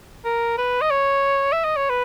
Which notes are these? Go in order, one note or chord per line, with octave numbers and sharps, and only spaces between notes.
A#4
B4
D#5
C#5
E5
D#5
C#5
B4